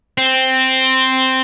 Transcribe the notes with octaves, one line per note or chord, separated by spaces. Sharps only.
C4